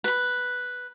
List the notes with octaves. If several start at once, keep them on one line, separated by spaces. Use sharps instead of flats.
B4 B5